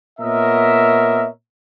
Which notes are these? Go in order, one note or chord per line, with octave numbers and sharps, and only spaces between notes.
A#2 B3 A#4 C#5 D#5 E5